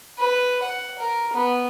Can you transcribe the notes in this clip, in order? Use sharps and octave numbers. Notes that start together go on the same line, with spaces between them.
B4
F#5
A#4
B3